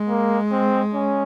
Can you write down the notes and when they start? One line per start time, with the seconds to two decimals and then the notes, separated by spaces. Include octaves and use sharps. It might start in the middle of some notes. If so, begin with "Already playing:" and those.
Already playing: G#3
0.09 A#3
0.52 C4
0.94 C#4